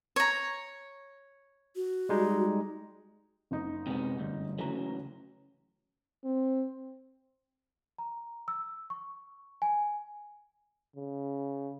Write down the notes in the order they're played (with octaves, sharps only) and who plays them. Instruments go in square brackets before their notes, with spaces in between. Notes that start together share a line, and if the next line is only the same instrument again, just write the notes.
[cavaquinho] C#5 A#5
[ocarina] F#4
[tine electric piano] G3 G#3 D#4
[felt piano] F#1 D#4 D#5
[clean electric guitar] C3 G#3 B3
D2 G2
[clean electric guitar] C#3 E3 F#3 [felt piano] A3 A#5
[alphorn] C4
[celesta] A#5
E6
C#6
G#5
[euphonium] C#3